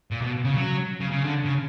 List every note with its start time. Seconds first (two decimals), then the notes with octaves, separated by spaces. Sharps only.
0.11 A#2
0.22 B2
0.44 C#3
0.56 F#3
1.00 C#3
1.12 C#3
1.22 D3
1.45 C#3